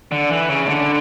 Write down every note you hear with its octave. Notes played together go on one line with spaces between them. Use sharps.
D3
E3
C#3
D3